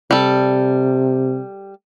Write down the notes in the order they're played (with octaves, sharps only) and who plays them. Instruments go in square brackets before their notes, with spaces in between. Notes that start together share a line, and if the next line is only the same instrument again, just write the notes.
[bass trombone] C3 [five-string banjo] G3 A4